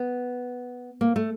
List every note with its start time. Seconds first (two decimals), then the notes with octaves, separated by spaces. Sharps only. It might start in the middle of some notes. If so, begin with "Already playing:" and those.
Already playing: B3
1.01 A#3
1.16 A3